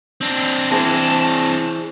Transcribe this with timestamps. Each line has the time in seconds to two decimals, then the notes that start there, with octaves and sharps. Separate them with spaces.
0.21 C4 D4
0.70 E3 G#4 C5 A5